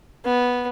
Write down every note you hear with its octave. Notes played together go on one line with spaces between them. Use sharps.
B3